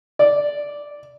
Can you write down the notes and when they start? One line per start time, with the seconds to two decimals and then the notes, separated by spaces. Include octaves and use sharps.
0.19 D5